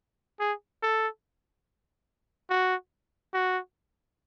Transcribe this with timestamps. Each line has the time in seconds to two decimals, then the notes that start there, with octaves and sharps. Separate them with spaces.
0.40 G#4
0.82 A4
2.50 F#4
3.34 F#4